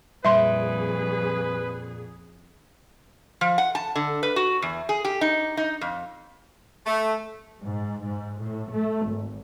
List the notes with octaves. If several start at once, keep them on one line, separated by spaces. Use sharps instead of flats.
F2 A#2 G3 G#4 B4 E5 C6
F3
F#5
A5
D3
B4
F#4
E2
G#4
G4
D#4
D#4
F2
A3
G#2
G#2
A2
A3
G#1